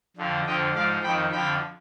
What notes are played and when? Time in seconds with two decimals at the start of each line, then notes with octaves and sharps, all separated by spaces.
0.17 F2 D3 F3
0.46 F2 D3 F3 D#5 G5
0.74 G#2 F3 D5 F5
1.03 F2 D#3 G5 B5
1.32 F2 D3 F3 G5 B5